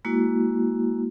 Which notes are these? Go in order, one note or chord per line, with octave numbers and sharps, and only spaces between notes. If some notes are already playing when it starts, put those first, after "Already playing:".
G#3 A#3 E4 F#4